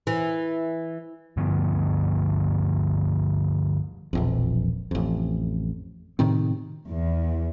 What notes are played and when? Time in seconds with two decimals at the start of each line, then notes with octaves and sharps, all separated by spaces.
0.07 E3
1.37 G2 D3 F3 B3
4.13 E1 A#1 F2
4.91 A1 F2
6.19 A2 C3 D#3 C4
6.89 E2